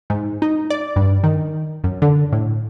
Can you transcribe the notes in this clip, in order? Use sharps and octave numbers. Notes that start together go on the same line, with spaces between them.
G#2
D#4
D5
G2
D#3
F#2
D3
A2